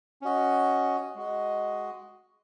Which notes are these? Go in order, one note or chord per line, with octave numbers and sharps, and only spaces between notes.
C#4 F#4 D#5
G#3 F#4 D#5